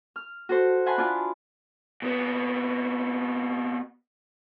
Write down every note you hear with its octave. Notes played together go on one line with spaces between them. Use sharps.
F6
F#4 A4 C5
E5 F#5 G#5 A5 B5 C6
D4 E4 F4 G#5 A5
A#2 B3